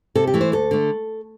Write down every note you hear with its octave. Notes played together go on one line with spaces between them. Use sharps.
C3 A4
G4
E3 A3
C5
D2 A4
D3 A3